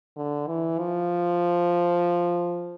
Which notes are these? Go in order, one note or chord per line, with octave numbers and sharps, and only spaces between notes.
D3
E3
F3